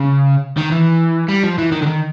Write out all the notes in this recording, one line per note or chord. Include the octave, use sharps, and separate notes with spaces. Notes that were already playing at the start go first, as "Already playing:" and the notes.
Already playing: C#3
D#3
E3
G3
F3
E3
D#3
D3
D#3